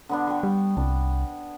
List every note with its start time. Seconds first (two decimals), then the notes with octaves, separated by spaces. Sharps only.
0.09 D3 B3 D4
0.27 G5 C#6
0.43 G3
0.77 C2 D4